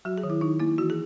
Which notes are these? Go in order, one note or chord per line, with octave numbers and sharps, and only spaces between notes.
F#3 F#4
G#4
D#3
E4
D#3 D#4
A#3 E4
E3 F#4
G#4